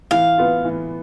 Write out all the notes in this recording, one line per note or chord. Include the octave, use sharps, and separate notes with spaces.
E3 F5
B3 F4
E3